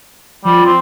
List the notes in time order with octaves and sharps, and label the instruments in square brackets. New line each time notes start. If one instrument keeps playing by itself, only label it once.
[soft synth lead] F3 [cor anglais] G3
[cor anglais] C4